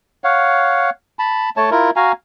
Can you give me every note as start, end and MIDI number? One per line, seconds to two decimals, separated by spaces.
0.24 0.90 73
0.24 0.90 77
0.24 0.90 78
1.19 1.50 81
1.19 1.50 83
1.57 1.70 57
1.57 1.70 73
1.57 1.70 81
1.71 1.90 64
1.71 1.90 65
1.71 1.90 70
1.96 2.12 66
1.96 2.12 77
1.96 2.12 80
1.96 2.12 82